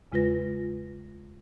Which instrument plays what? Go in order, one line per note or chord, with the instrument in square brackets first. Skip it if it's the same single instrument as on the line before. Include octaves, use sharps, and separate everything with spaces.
[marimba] E2 C#3 G#3 F4 B4 A#6